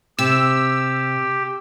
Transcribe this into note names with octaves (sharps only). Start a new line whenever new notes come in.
C3 G4 E6